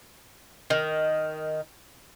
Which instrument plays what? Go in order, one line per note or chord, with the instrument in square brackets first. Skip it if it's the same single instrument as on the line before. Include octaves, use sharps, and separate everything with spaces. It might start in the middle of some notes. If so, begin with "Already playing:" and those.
[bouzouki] D#3